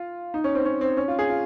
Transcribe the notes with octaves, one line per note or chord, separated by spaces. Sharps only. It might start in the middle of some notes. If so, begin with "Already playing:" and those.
Already playing: F4
D#4
C#4
C4
C#4
C4
C#4
F4
G#4
F4